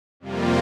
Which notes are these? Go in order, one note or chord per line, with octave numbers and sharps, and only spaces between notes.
F2 C3 G3 A#3 F4